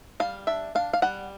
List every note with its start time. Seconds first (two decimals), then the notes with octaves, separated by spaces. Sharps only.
0.20 G3 F5
0.47 D4 E5
0.75 D4 F5
0.93 F5
1.02 G3 F#5